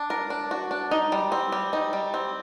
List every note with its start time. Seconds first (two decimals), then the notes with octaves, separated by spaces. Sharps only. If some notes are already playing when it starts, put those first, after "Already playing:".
Already playing: D4
0.10 A#4
0.30 D4
0.51 F#4
0.71 D4
0.91 D#4
1.12 G3
1.32 C4
1.52 G3
1.73 D#4
1.93 G3
2.14 C4